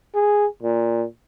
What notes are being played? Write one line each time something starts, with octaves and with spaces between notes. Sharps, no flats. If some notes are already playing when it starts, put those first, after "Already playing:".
G#4
A#2